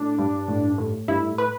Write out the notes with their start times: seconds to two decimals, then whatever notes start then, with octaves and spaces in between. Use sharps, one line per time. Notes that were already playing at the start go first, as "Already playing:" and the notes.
Already playing: A2 D4
0.19 G2
0.48 A2
0.78 A2
1.08 G2 E4
1.38 B4